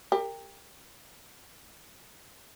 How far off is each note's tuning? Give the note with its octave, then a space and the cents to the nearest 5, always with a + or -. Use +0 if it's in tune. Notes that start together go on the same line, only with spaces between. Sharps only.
G4 +20 A#4 -20